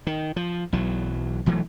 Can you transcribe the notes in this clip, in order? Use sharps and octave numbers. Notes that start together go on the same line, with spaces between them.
D#3
F3
B1 E3 F#3
B1 E3 F#3 A3